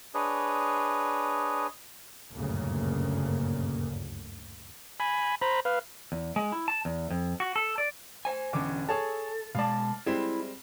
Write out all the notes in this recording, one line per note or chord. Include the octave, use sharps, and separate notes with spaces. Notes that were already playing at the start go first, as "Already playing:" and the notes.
D4 G#4 B4 C#5 D#5
F#1 D2 G2 A#2 C#3 A#3
G#5 B5
C5 A#5 B5
B4 F5
E2
G#3
E4
A5
E2
F2
F#4
A4
D5
C5 G#5
E1 D3 E3 C#4 D6
G#4 A4 C#5 A5
B2 G#3 D5 F5 A5
G3 G#3 C4 E4